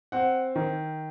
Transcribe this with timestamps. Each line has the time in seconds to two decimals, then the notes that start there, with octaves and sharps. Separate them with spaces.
0.12 C4 F#5
0.56 D#3